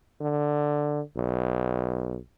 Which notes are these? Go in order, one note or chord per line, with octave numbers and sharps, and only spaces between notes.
D3
B1